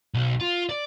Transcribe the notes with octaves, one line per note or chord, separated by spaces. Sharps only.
B1
F4
D5